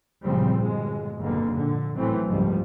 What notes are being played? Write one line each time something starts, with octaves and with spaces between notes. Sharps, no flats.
F#1 A#2 C#3 F3 G3 C4
G1 B2 G#3
F#1 F2 G#2 B2 D3 A#3
A#2 D3
G#1 A2 E3 F#3 A3 C4
F#1 C#2 G#2 F3 G3